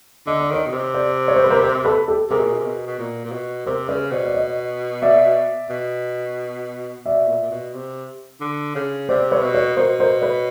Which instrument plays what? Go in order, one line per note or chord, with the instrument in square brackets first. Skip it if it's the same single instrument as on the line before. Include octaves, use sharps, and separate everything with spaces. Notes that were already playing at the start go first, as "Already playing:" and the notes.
[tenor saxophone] D3 [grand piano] D#5
[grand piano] D5
[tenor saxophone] D#3 [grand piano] C#5 D#5
[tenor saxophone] B2
C3
[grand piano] C5 D5
C#5
C5
B4
A#4 C5
A#4 C5
A4 B4
G4 A4
[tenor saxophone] C3 [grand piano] G#4 A#4
[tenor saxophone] B2
A#2
B2
C3
B2
B2
A#2
A#2
B2
[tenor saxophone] C3 [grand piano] A#4 C5
[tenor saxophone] C#3 [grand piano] B4 C#5
[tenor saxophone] B2 [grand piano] C5 D5
[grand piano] D5
C#5 D#5
D5 E5
[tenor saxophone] B2
[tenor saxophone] B2 [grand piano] D5 E5
[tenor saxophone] A#2
A#2
B2
C3
D3
C#3
[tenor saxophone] C3 [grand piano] C5 D5
[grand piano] B4 C#5
[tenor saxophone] B2
[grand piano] B4 C#5
[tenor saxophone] B2 [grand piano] A#4 C5
[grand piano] A#4 C5
B4 C#5